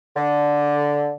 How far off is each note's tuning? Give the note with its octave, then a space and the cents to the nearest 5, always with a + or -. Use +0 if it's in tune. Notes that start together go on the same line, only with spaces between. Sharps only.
D3 -5